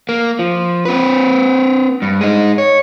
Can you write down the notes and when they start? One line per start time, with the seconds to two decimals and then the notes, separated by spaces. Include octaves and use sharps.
0.09 A#3
0.39 F3
0.85 C4 B4
2.02 G2
2.21 G#3 D#4
2.58 C#5